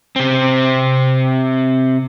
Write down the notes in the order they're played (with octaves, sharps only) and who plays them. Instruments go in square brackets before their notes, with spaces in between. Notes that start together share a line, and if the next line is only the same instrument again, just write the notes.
[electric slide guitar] C3 C4